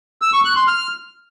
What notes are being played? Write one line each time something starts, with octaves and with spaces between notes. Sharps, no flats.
E6
C#6
F#6
C6
F6